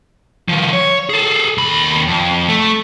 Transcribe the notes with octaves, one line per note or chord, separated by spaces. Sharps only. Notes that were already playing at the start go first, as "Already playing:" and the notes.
D#3 F3
C#5
G#4 A4
D#2 B5
F2
A3